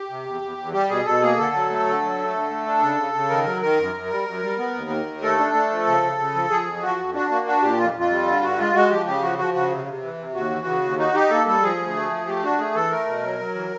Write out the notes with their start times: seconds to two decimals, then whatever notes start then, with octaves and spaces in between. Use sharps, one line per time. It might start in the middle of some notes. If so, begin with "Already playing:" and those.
Already playing: G4
0.10 C3
0.26 E2
0.42 E2
0.57 E2
0.73 G3 G4
0.89 B2 G#4
1.05 B2 A4
1.22 A#3 G#4
1.37 D3 A4
1.54 F#3
1.70 A3
1.86 D3
2.02 F#3
2.18 A3
2.34 D3
2.50 A3
2.66 D4
2.82 C#3
2.98 C#3
3.14 C#3
3.30 D#3 A#4
3.46 F#3
3.62 D#3 A#4
3.78 F#2
3.94 F#2
4.10 G3
4.26 F#2
4.42 G3
4.58 B3
4.74 D#2
4.90 D#3
5.06 D#2
5.22 A3 A4
5.38 D4
5.54 A3
5.70 F3
5.86 C#3
6.02 C#3
6.18 C#3
6.35 F3
6.50 F3 G#4
6.67 F2
6.82 F3 F#4
6.98 F2
7.14 D4 F#4
7.30 A#3 F#4
7.46 D4 F#4
7.62 A#2 G4
7.78 F2 F4
7.94 F2
7.99 F4
8.10 G3
8.26 D3
8.42 G2 F#4
8.58 G#3 F4
8.74 G#3 F#4
8.90 F3 G4
9.06 C#3 G4
9.22 F3 F#4
9.38 F3 F#4
9.54 C#3 F#4
9.70 C3
9.86 C3
10.02 E3
10.18 C3
10.35 D#2 F#4
10.51 E3
10.66 C#3
10.83 D#2
10.99 D#4 F#4
11.14 D#4 G4
11.30 A#3 A4
11.46 G3 A4
11.63 F3 G#4
11.78 D2
11.95 A3
12.11 F3
12.27 A3 G4
12.43 D4 F#4
12.59 A3 G#4
12.75 E3 A4
12.90 A3 A#4
13.07 B2
13.23 F#3
13.39 F#3
13.55 E3